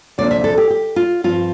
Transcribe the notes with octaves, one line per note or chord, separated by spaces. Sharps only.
D2 C3 F3 A#3 D4 D5
E5
A4
G4
G4
F4
G2 F3 C4 F4